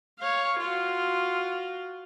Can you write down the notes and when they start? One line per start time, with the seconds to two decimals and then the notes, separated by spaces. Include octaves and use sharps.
0.19 C#5 F5
0.60 F4 F#4